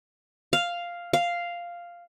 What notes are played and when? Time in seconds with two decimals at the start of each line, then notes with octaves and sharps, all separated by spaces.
0.53 F5
1.13 F5